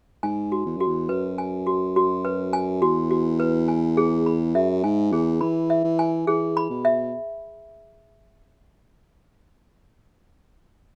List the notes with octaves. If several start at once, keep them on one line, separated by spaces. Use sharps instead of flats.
G#2 G#5
F#4
E2
F#2 F#4
E2
F#2 B4
G#5
F#4
F#4
B4
G#5
E2 F#4
F#4
B4
G#5
G#4
B5
F#2 E5
G#2 G#5
E2 G#4
E3 B5
E5
E3
G#5
E3 G#4
B5
B2
E5